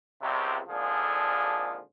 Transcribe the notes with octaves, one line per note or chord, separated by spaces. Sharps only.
C#2 C3
G#1 A#2 D3 F3 G#4 A4